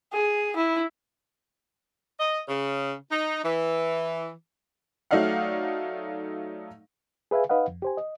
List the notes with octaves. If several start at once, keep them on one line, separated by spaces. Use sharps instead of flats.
G#4
E4
D#5
C#3
D#4
E3
F#3 A3 D#4 D5 F5 F#5
G#4 B4 E5 F5 G#5
D#4 B4 D#5 F5 F#5
F2
G4 C5 G#5
D#5